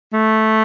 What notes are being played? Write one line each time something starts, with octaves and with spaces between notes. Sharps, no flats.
A3